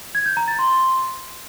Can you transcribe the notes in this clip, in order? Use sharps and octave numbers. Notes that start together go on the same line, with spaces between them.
G#6
G6
A#5
A6
C6